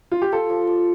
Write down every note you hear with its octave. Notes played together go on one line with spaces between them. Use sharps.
F4
G4
F4 A4
F3
D5